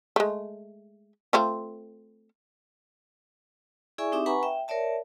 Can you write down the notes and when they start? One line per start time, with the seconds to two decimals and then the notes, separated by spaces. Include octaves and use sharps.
0.16 G#3 A3
1.33 A3 C4 F4
3.98 E4 G#4 D5 E5 G#5 C#6
4.12 C4 D#4 G4 E5 D6
4.26 B4 F#5 G#5 A#5 B5 C#6
4.43 E5 G5
4.68 A#4 C#5 D5 E5 A5